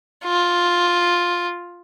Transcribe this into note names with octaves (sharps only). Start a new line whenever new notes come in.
F4